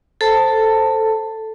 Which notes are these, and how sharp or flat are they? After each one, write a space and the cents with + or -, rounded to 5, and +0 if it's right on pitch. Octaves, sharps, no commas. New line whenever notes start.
A4 +0 C5 +0 A5 +15